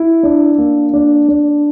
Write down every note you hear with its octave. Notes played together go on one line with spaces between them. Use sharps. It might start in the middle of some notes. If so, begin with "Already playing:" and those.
Already playing: E4
D4
A#3
D4
D4